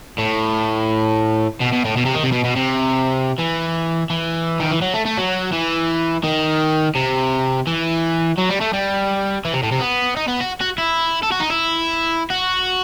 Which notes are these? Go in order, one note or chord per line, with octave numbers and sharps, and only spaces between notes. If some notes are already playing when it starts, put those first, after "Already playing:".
A2
B2
B2
A2
B2
C3
D#3
C3
B2
B2
C3
E3
E3
D#3
E3
F#3
A3
A3
F#3
E3
D#3
C3
E3
F#3
G3
A3
G3
E3
C3
A2
C3
B3
D#4
B3
F#4
F#4
E4
A4
F#4
D#4
E4
F#4